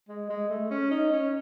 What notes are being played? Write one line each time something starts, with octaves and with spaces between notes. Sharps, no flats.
G#3
G#3
A3
C#4
D#4
C#4